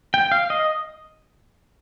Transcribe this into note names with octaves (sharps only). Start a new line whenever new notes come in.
G5
F5
D#5